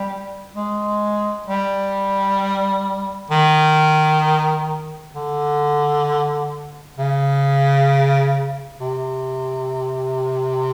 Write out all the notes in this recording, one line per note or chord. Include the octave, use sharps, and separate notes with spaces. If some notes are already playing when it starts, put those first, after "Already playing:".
Already playing: G3
G#3
G3
D#3
D3
C#3
C3